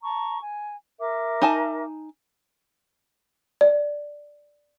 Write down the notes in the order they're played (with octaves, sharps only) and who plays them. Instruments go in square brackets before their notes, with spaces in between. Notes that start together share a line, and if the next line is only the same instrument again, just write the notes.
[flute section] A5 A#5 C#6
G#5
A#4 E5 D6
[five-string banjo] D#4 G#5 A5
[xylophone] D5